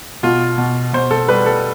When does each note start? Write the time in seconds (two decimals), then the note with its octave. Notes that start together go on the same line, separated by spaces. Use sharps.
0.23 B2 F4
0.58 B2
0.93 B2 C5
1.11 A4
1.28 G3 B4
1.46 A4